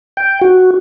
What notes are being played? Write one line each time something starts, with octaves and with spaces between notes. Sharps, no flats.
G5
F#4